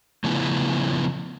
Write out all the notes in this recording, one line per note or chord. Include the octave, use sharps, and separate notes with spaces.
A2 C#3 F3 B3 E4